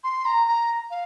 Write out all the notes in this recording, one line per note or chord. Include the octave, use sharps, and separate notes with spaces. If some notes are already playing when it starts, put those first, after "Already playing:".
C6
A#5
A#5
F5